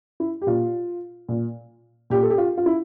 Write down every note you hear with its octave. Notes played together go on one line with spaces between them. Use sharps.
E4
G4
A#2 F4
A#2
A#2 G4
A4
G4
F4
F4
E4